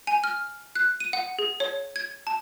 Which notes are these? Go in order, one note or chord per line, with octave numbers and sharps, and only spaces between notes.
G#5
F6
F#6
D#7
F#5
G#4
C#5
G#6
A5